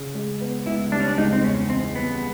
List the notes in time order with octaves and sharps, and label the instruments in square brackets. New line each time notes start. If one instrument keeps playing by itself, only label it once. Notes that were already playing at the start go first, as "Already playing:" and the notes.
Already playing: [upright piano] C#3
G#3
B3
[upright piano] C#2 [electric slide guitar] E4
[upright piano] G3 [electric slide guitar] D4
[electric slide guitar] C#4
D4
[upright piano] C#2 [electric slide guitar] D#4
[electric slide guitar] C4
[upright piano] E2 [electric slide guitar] C#4
[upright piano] E3 [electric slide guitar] C4
[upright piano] G3 [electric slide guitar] B3